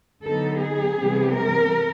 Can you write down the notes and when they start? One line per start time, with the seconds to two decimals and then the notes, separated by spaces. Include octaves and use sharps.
0.23 D3 F#3 B3 D#4 A4
0.60 G#4
0.97 C3 E3 G3 B3
1.35 A#4